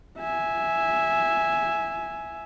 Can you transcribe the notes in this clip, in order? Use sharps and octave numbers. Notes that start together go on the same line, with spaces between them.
E5 G#5